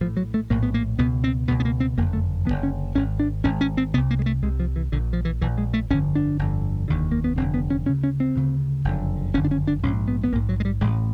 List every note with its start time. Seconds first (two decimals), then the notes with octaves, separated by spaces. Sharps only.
0.01 A#1 A2 F3
0.17 F#3
0.34 A3
0.50 A#1 A2 A#3
0.63 B3
0.74 A#3
0.99 C#2 B2 B3
1.24 C4
1.48 C#2 B2 B3
1.60 B3
1.65 A#3
1.80 C4
1.98 F#1 F2 D3 A#3
2.13 A3
2.46 F#1 F2 D3 B3
2.63 C#4
2.95 G#1 G#2 C#4
3.20 D4
3.44 G#1 G#2 C#4
3.61 C#4
3.77 C4
3.94 C3 B3
3.97 C2
4.11 A#3
4.19 G#3
4.26 A3
4.42 C2 C3 G#3
4.60 F3
4.76 E3
4.92 A#1 A#2 D3
5.13 F3
5.25 E3
5.41 A#1 E3
5.45 A#2
5.58 G#3
5.74 A3
5.90 G1 F2 D3 C#4
6.15 D4
6.39 G1 F2 D3
6.88 F1 D#2 D3
7.12 A#3
7.24 B3
7.37 F1 D#2 D3 C4
7.54 B3
7.70 C#4
7.86 D2 C#3 C#4
8.04 C#4
8.20 C4
8.36 D2 C#3
8.85 F#1 F2 D3
9.34 F#1 F2 D3 C#4
9.45 D4
9.51 C#4
9.67 D4
9.83 A#1 C#4
9.87 G#2
10.08 B3
10.24 B3
10.32 A#1 G#2 A#3
10.49 F#3
10.60 G#3
10.65 G3
10.81 A1 A2 G#3